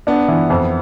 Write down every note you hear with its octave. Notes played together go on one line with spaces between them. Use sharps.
B3 D4
E3
F2